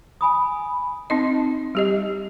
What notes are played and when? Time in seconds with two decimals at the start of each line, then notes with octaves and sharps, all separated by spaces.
0.21 G#5 B5 D#6
1.10 C4 D#4 D#5
1.75 G3 G4 D#5